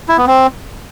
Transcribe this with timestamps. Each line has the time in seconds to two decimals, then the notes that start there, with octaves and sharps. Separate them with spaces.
0.08 E4
0.18 B3
0.27 C4